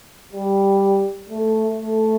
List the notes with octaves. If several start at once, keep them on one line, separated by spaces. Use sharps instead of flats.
G3
A3
A3